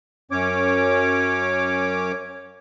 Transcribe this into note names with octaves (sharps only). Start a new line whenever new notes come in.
F#2 C#4 C#5 D6